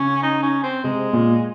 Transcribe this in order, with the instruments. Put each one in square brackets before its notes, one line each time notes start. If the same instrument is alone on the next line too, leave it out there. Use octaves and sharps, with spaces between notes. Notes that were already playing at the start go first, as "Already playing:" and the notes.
Already playing: [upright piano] C#3 [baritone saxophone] C#4
[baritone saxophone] D#4
C#4
C4
[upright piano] C3 [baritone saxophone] G#3
[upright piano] A#2